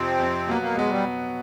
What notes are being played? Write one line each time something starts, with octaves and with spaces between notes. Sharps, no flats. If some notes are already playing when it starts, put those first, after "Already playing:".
Already playing: F2 C3 F3 C4
F2 C3 F3
B2 F#3 A#3 B3
A#3
B2 F#3 G#3 B3
G3